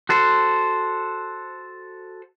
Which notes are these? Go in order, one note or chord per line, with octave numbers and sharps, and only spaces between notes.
F#4 A4 C5